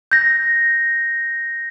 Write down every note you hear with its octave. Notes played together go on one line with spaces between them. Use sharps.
G6 A#6